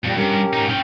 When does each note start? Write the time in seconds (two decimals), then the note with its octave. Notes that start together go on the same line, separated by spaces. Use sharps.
0.05 F2 A#2 G3
0.18 G2 C#4 G4 A#4
0.53 G#2 D#4
0.70 C#4 G5